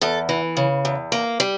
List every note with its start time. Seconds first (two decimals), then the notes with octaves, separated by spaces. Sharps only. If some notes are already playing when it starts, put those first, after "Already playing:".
0.01 E2 A4
0.29 E3
0.57 C#3
0.85 E2
1.12 A#3
1.40 G3